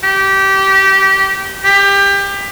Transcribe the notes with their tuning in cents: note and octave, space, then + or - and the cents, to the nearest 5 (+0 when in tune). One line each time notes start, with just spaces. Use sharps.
G4 -20
G4 +25